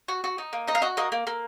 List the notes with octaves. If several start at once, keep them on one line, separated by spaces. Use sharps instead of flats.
F#4
F#4
D#4
A#3
D#4 D#5
F5
F#4 D#5
A#3 D#5
A#3
A#3